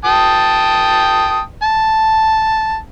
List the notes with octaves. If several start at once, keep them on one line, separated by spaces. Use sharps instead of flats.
G5 A5 D#6
A5